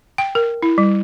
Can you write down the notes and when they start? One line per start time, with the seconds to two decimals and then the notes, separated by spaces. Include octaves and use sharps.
0.18 G5
0.35 A#4
0.63 E4
0.78 G3